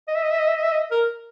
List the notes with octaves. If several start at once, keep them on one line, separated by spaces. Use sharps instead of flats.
D#5
E5
D#5
E5
D#5
E5
D#5
E5
D#5
A#4